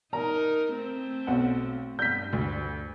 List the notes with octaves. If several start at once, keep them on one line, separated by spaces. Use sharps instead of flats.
D#4 A#4 A#5
A3 C4
B1 F#5
G2 G6 B6
D2